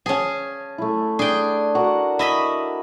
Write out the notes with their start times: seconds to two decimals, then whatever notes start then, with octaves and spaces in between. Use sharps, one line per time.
0.06 C#4 G#4 G#5 A5
0.78 A3 E4
1.19 D4 G#4 G5
1.75 F#4 A#4 F#5
2.19 E4 D#5 B5